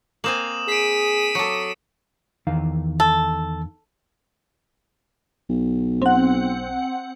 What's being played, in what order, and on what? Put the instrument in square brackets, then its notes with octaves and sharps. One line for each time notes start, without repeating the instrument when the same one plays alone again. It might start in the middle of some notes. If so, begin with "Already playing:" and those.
[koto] A#3 C4 G#5 [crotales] D#6 E7 F#7
[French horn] G#4 [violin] B6 D#7 [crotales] C7 D7
[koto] F#3 A4 [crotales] D6 C#7
[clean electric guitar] E2 D#3 F5
[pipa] A4
[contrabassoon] B1
[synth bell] C4 F#5